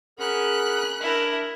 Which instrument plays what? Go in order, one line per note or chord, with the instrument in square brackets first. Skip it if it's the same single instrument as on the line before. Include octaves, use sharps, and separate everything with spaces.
[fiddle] C#4 [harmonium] G#4 A#4 F#5 [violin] B5 F#6
[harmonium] D4 [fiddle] E4 A#4